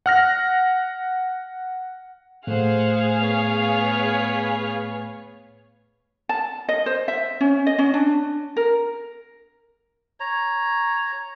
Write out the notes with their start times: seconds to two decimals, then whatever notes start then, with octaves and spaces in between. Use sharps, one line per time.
0.06 F#5 F6 A#6
2.47 A2 A3 G#4 C5 F5 F#5
3.19 B3 C#5
6.29 A5
6.69 D#5
6.86 C5
7.08 E5
7.41 C#4
7.66 D#5
7.79 C#4
7.94 D4
8.56 A#4
10.20 C#5 A#5